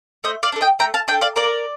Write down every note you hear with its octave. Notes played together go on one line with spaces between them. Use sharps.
A3 C5 D#5
D5 F5
D4 A4
D#5 G5
A3 G5 A#5
F5 A5
D4 A4 D#5 G5
D5 F5
A#3 A#4 D5